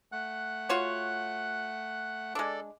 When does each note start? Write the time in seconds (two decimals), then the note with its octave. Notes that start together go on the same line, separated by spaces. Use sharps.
0.12 A3 F#5 F#6
0.69 F4 F#4 C#5
2.35 G#3 D4 A4 D5